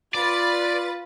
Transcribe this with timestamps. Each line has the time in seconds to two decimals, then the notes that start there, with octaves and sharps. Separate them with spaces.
0.14 F4 B4 D5 A6